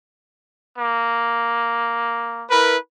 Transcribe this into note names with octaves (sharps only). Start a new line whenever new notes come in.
A#3
E4 A#4 B4